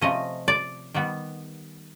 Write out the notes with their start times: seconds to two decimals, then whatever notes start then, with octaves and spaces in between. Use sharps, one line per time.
0.01 C3 F3 A3 C#4 D#5
0.48 D5
0.94 D#3 G3 B3